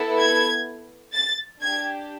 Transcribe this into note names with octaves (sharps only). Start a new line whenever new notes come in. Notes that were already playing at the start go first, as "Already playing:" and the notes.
Already playing: B3 E4 A4
G#6
A6
D4 G4 G#6